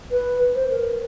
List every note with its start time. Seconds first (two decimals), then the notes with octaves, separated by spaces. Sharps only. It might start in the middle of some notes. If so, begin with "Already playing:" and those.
0.12 B4
0.55 C5
0.70 A#4